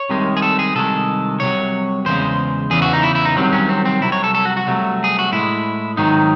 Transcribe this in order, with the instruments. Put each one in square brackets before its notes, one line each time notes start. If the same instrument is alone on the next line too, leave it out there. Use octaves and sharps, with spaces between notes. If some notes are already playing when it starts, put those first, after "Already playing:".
Already playing: [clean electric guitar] C#5
C2 C3 D#3 G#3
G#4
A4
G#4
C2 C3 D#3 G#3 A4
C2 C3 F#3 C#5
E2 C#3 G#3 C5
E2 C#3 E3 G#4
F#4
D#4
E4
E4
D#4
C2 C3 D#3 F#3 C4
C#4
C4
C4
C2 C3 F#3 E4
C#5
A4
A4
F#4
F#4
C2 C3 F#3 A3
G#4
F#4
A2 G#3 E4
G#2 D#3 F#3 D#4